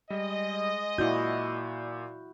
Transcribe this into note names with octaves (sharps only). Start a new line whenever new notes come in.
G3 G#3 D#5
A#2 E4 F#4 D5 G6